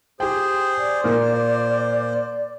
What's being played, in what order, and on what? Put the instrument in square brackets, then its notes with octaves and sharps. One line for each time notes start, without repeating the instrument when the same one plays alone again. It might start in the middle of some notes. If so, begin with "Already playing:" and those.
[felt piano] G4 G5 [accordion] G#4 C5
[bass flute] D5
[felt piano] A#2 A#3 [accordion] C5